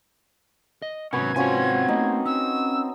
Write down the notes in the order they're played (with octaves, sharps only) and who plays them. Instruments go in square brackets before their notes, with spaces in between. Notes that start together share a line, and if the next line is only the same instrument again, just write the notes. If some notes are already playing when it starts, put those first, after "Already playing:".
[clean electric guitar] D#5
[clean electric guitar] G#2 C3 [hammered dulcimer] B3 [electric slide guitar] C#4 F#4 [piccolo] G#6
[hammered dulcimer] F3 C#4 F#4 [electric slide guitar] C4 G#5
[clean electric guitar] A3 A#3 [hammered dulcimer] D#4
[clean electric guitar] C#4 [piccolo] E6